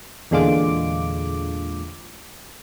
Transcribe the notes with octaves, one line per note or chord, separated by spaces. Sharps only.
E2 A#2 D3 G#3 F4 D6